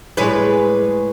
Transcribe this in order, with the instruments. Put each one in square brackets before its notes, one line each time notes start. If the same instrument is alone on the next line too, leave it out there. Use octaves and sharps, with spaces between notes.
[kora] A2 G#3 [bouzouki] G3 G#4 C#5 [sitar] B4